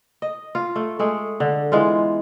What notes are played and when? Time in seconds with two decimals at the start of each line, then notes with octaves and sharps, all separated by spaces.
0.22 D#5
0.55 F4
0.76 A3
0.99 G#3 A3 G#4
1.40 D3
1.72 E3 G#3 B3 F4